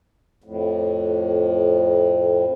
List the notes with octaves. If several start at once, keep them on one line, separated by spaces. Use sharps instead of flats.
F2 A2